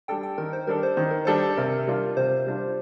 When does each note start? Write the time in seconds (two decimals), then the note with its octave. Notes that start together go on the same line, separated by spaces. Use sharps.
0.08 G3 D4 A4 G5
0.23 G5
0.38 D#3 A#4
0.53 C5
0.67 G3 D4 A4 A#4
0.83 C5
0.97 D#3 C5
1.11 A#4
1.25 G3 D4 A4 C5
1.57 C3 A#4
1.87 G3 D4 F4
2.17 C3 C5
2.47 G3 D4 F4